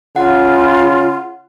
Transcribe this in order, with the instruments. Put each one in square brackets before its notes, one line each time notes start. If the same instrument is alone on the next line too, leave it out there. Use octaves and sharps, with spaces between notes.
[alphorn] C#3 [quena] F4 [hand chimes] F#5